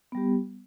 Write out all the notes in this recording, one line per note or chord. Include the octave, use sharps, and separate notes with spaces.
G3 B3 G4